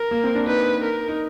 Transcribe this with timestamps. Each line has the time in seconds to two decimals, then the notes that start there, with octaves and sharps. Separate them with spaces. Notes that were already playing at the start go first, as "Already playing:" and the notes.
Already playing: A#4
0.11 A#3
0.24 C4
0.35 D4
0.47 D#4 B4
0.84 A#4
1.08 D#4